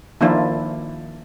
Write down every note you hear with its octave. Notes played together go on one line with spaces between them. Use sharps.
D#3 F3 A#3 D4 E4 F4